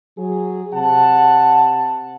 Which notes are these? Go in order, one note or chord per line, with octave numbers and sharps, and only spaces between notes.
F#3 G#4
C3 F#5 A5